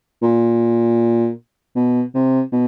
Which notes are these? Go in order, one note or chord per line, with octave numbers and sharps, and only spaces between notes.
A#2
B2
C3
B2